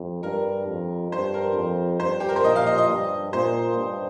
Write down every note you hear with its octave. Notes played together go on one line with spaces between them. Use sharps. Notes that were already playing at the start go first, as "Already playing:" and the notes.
Already playing: F2
G2 A#4
F2
G2 C5
A#4
F2
G2 C5
G4
A#4
C5
A#2 D#5
F5
D#5
D#5
G2
A#2 C5
G2